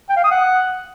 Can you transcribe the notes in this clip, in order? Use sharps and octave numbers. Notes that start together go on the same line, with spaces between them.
G5
F5
D#6
F#5